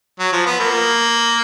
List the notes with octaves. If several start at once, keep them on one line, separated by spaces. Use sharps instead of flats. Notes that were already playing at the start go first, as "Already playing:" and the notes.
F#3
F3
B3
A#3